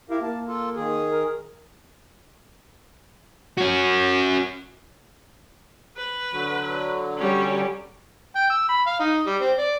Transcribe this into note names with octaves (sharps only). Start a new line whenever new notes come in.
E4 G4 A#4 F5
A#3 A5
F4 A4
D#3 G#4
A#4
C#4 F#4
B4
D3 F#3
G3 C#4
G5
E6
B5
F5
D#4
G3
C4
D5